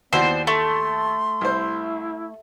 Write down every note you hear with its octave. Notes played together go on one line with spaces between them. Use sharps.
D#2 B3 E4 F#4 C5 D5
A3 A4 C6
C2 E4 C5